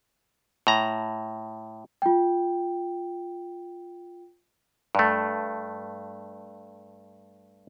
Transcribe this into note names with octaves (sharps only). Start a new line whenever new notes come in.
A2 A#5
F4 G5
G2 A3